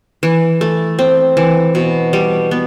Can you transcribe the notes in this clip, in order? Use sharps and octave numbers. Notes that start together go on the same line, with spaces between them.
E3
A3
C4
E3
B2
G3
B3